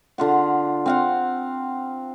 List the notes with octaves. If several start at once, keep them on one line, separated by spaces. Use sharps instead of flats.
D3 F4 F#5
C4 F5 F#5